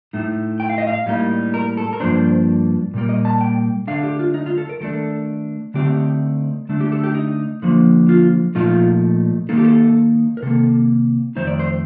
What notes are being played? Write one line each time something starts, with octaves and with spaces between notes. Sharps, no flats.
A2 A3 D#4
G5
F5
D#5
F5
A2 G3 A#3 D#4
A#4
A4
A#4
G2 F3 A#3 D4 C5
A#2 G3 A#3
D#5
A5
G5
D3 A3 D4 F5
G4
F4
D#4
F4
A4
A#4
D#3 A3 D4 A4
D3 A3 C4 D#4 G4
D3 A3 D4
G4
A4
G4
D#4
D3 F3 A#3
F4
A#2 F3 A3 D#4 F4
D#3 A#3 D#4 A4
G4
A4
A#4
C3 D#3 A#3 A4
F2 D#3 A3 D#4 C5
D5
C5